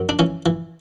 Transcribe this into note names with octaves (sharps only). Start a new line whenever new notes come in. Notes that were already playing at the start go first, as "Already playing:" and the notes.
Already playing: F#2
D4
E3 C#4
E3